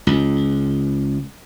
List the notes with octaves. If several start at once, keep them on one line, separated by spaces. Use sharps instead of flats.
C#2